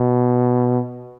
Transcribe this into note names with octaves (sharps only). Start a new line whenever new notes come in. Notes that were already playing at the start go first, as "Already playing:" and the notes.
Already playing: B2